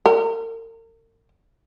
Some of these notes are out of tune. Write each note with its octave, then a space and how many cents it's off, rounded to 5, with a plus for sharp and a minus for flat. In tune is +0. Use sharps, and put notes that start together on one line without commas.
A#4 -40